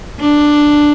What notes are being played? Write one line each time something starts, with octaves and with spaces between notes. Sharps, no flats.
D4